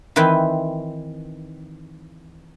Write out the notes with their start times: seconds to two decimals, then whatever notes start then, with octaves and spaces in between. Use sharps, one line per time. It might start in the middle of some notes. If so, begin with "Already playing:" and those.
0.16 D#3 E3 C4 B4 G5